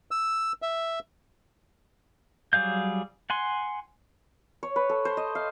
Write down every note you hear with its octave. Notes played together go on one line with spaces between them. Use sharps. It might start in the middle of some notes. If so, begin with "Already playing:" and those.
E6
E5
F#3 G3 G#4 F5 G6
F#5 G#5 C6
C#5
B4
A4
C5
D#5
F5